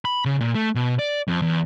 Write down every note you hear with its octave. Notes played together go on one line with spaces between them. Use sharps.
B5
C#3
A#2
A3
B2
D5
F2
E2